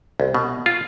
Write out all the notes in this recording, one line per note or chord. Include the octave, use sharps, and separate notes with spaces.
C2
B2
F4